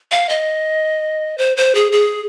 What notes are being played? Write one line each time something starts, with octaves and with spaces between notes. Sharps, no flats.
F5
D#5
C5
C5
G#4
G#4